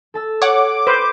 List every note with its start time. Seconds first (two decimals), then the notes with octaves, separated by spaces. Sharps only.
0.14 A4 A5 E6
0.42 C#5 F#5 D6
0.87 B4 C5